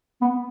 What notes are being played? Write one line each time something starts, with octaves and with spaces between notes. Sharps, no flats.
B3